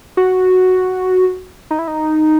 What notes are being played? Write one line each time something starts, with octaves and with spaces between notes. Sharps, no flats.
F#4
D#4
E4
D#4